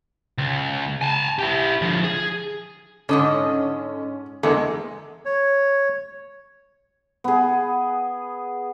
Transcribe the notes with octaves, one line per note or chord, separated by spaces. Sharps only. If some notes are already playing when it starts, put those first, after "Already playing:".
C#2
G#5 A5
E4 G4
D3 F3
G#4
G#2 D3 C#4 A4 D#5
E2 D3 G#3 A#3 A4
C#5
B3 G#4